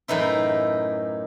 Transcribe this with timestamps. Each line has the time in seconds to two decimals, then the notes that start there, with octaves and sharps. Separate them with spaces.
0.08 F#2 A2 E3 D#4 E4